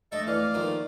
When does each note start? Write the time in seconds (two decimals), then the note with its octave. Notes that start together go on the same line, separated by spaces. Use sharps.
0.12 F2 A3 D4 A4 D#5 E5
0.27 E3 D5 F5
0.54 E2 D#3 F3 A3 A#3